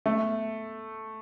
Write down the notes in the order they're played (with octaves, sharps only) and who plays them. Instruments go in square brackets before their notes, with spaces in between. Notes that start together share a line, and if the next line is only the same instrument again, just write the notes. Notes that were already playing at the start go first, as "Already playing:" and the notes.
[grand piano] A3